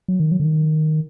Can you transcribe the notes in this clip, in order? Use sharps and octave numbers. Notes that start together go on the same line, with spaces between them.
F#3
D#3
F#3
D3
D#3